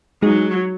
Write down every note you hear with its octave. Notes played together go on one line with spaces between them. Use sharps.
F#3 G#3 D#4 G#4